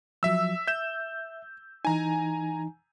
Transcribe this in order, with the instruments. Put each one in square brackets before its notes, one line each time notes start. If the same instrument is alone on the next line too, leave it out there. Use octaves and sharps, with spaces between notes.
[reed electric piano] F3 F#3 [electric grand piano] E5 E6
[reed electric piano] E5 [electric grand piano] G6 E7
[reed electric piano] E3 D#4 [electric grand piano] G#5 A#5